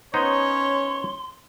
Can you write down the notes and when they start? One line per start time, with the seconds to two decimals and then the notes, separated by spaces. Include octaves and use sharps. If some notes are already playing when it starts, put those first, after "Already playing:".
0.14 B3 C#4 D#4 C5 C#5 C6